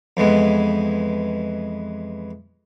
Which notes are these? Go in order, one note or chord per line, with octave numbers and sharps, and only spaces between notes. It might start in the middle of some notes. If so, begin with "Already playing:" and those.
F2 E3 G#3 B3